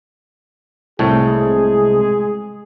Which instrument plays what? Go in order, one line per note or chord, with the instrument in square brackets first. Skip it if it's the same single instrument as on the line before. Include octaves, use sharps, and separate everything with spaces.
[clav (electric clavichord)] C2 A2 [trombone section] G#3 G#4